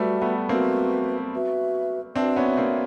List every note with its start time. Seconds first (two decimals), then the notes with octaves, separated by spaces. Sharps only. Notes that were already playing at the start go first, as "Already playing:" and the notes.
Already playing: G3 A3 F#4 B4 E5
0.22 A3 B3
0.48 A#3 C4 F#4 B4 E5
1.33 F#4 B4 E5
2.16 C4 D4 F#4 B4 E5
2.36 B3 C#4
2.57 A#3 C4